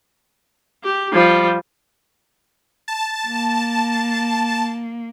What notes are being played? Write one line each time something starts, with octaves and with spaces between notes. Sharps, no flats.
G4
F3 G3
A5
A#3